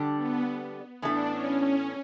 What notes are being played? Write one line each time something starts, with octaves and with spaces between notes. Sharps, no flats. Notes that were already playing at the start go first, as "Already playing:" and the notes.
Already playing: D3 G3 D4 A4
B3
A2 E3 B3 D4 E4 A4
C#4
C#4